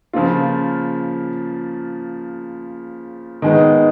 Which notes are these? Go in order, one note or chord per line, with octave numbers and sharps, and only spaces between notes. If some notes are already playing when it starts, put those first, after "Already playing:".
C#3 F3 A#3 F4
D#3 G#3 B3